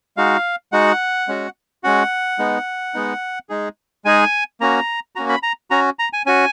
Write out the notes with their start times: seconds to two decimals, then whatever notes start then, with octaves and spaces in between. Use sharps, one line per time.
0.17 G#3 D#4 F#4 F5
0.72 G#3 D#4 F#4 F#5
1.28 G#3 C#4 F#4
1.84 G#3 C#4 F#4 F#5
2.39 G#3 B3 D#4
2.94 G#3 B3 D#4
3.49 G#3 D#4 G#4
4.05 G#3 D#4 G#4 G#5
4.61 A#3 C#4 F#4 A#5
5.15 A#3 C#4 F#4 A#5
5.29 B5
5.43 A#5
5.71 C#4 F#4 A#5
5.99 A#5
6.13 G#5
6.26 C#4 F#4 G#5